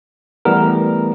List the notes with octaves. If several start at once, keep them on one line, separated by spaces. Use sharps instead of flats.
E3 G3 A3 B3 A#4